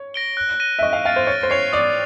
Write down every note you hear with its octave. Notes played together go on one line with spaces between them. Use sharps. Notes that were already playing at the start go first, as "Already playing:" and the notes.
Already playing: C#5
A#6 D7 G7
F#6
A#6 D#7 G7
E5
D#5 C#6
F5
F5 F6 A6 D7
C5
C#5 A6
C5
C#5 C7 F7
D5 D#6